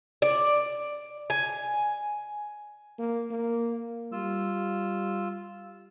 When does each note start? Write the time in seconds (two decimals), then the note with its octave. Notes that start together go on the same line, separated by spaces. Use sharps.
0.22 D5
1.30 G#5
2.99 A#3
3.31 A#3
4.12 G3 F4 E6